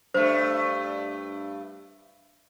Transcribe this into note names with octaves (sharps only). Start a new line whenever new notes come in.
G2 A3 C5